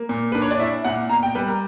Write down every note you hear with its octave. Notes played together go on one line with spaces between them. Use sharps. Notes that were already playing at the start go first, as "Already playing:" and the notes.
Already playing: A#3
A#2
D4 B4
C#5
D5
E4 E5
A#2 F#5
B2 A#5
G5
G3 B4
A#4